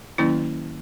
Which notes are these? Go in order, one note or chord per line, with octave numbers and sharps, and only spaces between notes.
D#3 F#3 A#3 C#4 E4